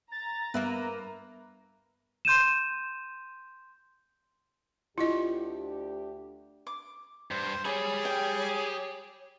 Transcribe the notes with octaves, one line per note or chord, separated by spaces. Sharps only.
A#5 A6
G2 A#3 B3 A#4 B4 E5
C6 G6 D#7 E7
D2 D4 E4 F4 G4 D#5
D6
G2 C5
G4 G#4 C#5 G#5 B5
G5